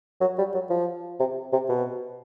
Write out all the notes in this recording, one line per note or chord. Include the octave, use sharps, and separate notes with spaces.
F#3
G3
F#3
F3
C3
C3
B2